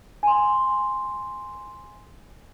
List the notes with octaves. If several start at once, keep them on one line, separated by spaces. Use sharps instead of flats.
G#5 C6